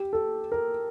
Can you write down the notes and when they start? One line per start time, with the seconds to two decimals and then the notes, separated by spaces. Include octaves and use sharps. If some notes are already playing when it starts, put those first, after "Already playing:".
Already playing: G4
0.13 A4
0.52 A#4